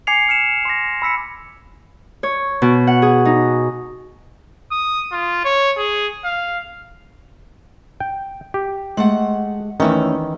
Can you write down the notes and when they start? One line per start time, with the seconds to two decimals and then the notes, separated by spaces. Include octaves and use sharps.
0.07 G#5 D6 G#6 C7 C#7 F7
0.29 F6 C#7 E7
0.65 C6 D6 A#6
1.02 B5 E6 B6 C#7
2.23 C#5
2.62 B2
2.87 F#5
3.02 G#4
3.25 D#4
4.72 D#6
5.12 F4
5.44 C#5
5.78 G#4
6.24 F5
8.00 G5
8.54 G4
8.97 G#3 A3 F#5
9.80 E2 D#3 E3 A3 C#4